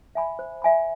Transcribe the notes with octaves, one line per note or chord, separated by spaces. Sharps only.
E5 G#5 B5
C5
E5 G#5 B5